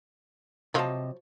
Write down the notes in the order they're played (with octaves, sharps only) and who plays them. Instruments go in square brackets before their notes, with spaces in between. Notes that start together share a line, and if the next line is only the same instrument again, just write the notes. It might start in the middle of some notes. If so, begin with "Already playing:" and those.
[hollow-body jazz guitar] C3 D#5 A5 [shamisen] F3 F#3 F4